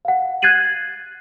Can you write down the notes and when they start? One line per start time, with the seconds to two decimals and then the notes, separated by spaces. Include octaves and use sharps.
0.05 F5 F#5
0.42 F#6 G#6 A6 C7 D#7 F#7